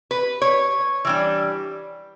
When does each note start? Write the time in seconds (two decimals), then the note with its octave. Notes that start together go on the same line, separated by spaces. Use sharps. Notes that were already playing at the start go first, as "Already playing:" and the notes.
0.11 B4
0.42 C#5
1.05 E3 G3 D4